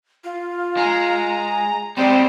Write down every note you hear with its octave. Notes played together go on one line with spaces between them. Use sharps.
F4
G#3 A#5
G3 G#3 C4 C5 D5